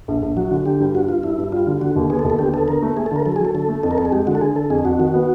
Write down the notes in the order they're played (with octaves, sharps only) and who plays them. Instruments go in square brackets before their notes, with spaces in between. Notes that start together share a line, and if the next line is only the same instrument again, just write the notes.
[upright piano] A#1
A#1
[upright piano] F#3 [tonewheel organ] F#4
[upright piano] D3
[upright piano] D3 [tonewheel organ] G4
[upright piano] G2
[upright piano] G2 [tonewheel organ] F#4
[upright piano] G2 [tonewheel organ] F4
[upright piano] G2 [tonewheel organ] E4
[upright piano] G2
[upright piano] G3 [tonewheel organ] F4
[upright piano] D3
[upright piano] D3 [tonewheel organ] F#4
[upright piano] D#2
[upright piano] B3 [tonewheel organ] G#4
[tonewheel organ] A4
[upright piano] D#2
[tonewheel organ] A4
[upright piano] D3 [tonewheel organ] G4
[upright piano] B3 [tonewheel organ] A4
[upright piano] D3 [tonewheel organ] A#4
[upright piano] A3
[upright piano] A3 [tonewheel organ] G#4
[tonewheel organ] A4
[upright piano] D3 [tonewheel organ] A#4
[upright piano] F#3 [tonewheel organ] A4
[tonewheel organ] G#4
[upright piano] F#3 [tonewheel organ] A4
[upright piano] D3 [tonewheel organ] A4
[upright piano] A3
[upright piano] F2 [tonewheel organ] A4
[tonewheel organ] A#4
[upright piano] F2 [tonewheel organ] A4
[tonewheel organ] G#4
[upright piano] G#3 [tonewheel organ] G4
[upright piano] D3 [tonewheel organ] F#4
[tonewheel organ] A4
[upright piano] D3 [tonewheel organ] G#4
[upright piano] D3 [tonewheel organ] A4
[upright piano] F2 [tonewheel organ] G#4
[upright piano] F2 [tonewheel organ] F#4
[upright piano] D#3 [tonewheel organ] F#4
[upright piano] B3